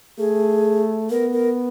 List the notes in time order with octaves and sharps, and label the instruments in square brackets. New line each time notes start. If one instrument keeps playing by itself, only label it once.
[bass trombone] A3 [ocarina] G#4
[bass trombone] B3 [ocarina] A#4
[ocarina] A#4